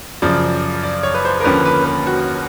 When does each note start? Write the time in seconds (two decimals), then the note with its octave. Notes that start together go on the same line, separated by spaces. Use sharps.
0.22 F#2 C#3 F3 D5
0.83 D5
1.03 C#5
1.14 B4
1.25 C5
1.40 A#4
1.44 D#2 D3 F3 A#3 C#4 B4
1.65 B4
1.85 B4
2.07 F#4